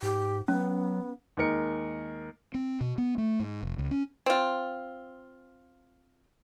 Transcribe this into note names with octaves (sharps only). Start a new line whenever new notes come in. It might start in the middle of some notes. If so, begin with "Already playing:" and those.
G#2 G4
F#3 B3 C#4
D#2 G#3 A#4 C#7
C4
B2
B3
A3
G#2
F1
C#2
C#4
C4 F4